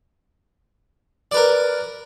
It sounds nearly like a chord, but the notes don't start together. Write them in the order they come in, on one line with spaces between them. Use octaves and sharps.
D5 B4 A#4